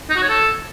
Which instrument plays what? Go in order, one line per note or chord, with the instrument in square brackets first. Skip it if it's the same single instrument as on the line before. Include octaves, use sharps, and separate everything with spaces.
[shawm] D#4
F#4
C#5
A4